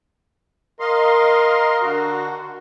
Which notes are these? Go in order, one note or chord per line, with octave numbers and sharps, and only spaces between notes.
A#4 D#5 F5 C6
D3 F#4